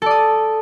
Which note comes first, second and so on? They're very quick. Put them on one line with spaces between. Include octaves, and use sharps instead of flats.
A4 D5 D#6